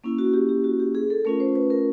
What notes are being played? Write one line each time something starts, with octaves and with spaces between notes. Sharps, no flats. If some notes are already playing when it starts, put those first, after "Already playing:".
A#3 C#4 E4
F#4
G4
G4
F#4
G4
G#4
A4
A3 C#4 F4 A#4
C5
B4
A#4